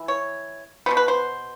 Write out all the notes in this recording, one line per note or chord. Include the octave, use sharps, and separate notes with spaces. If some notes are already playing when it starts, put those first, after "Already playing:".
Already playing: E3
C#5
B2 G3 B3 C5
B4
C5